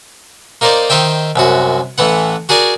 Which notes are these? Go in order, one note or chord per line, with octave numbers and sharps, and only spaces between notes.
A#3 D#4 A#4 C5 D5
D#3 D#4 C5 E5 G5
C2 F#2 F#4
A1 E3 B3 F#5
F#4 G#4 A#4 D5 G#5